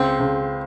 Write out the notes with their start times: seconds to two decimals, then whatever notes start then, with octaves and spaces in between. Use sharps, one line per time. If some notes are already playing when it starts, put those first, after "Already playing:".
Already playing: C#2 C4
0.19 C#2